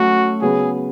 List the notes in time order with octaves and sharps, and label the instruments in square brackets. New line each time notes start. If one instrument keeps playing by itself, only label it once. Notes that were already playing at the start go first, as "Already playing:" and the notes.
Already playing: [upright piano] F#3 A3 C#4 [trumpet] F#4
[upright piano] C#3 F#3 B3 [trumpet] G#4